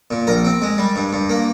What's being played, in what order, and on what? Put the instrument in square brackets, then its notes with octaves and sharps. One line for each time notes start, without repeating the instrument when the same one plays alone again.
[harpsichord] A#2
A#1 A#4
C4
G#3
G3
G2
G2
A#3